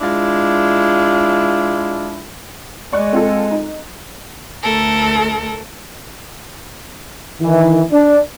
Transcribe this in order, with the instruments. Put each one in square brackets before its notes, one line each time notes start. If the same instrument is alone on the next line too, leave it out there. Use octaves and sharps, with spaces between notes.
[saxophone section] G#3 D4 E4 F4
[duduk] G#3 [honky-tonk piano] D5 C#6 F#6
[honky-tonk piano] C4 F4 A4
D#4
[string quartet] D2 A3 A4 A#4
[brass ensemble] D#3 E3
D4